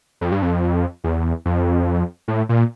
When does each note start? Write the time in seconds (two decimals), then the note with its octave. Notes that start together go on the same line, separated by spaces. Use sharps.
0.21 F2
0.32 G2
0.42 F2
1.04 E2
1.45 F2
2.28 A2
2.49 A#2